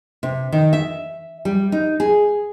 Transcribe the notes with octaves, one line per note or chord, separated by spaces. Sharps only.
C3
D#3
E5
G3
D#4
G#4